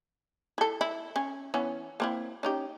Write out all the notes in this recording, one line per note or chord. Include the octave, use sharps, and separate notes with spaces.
E4 A4
E4
C#4
E3 B3 C#4
A#3 C4 E4
C#4 D#4 G4